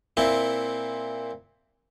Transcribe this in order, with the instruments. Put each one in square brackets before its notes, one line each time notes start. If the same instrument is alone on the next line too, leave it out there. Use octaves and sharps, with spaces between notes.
[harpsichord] A#2 C4 E4